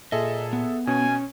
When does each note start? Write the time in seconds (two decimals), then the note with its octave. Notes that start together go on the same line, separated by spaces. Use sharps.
0.12 A#2 G#4 A4 D#5 E5
0.53 B3
0.87 B2 C#4 G#5